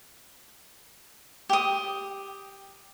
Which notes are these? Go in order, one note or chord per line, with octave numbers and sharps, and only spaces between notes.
G4 D#6